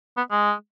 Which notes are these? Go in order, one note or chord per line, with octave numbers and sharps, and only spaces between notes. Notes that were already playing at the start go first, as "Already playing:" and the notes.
B3
G#3